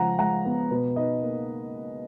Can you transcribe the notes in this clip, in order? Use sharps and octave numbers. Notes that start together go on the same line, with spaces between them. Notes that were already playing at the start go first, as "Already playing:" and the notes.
Already playing: C#3 F3 G#3 F#5 A#5
G#3 F#5 A#5
B3
B2 B4
D#4 B4 D#5
A#3